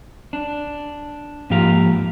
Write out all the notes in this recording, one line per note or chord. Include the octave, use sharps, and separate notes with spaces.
D4
G#2 F3 A#3 G4 F5 A#5